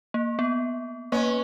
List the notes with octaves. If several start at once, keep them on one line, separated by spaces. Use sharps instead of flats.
A#3
B3
A#3 B3 C#4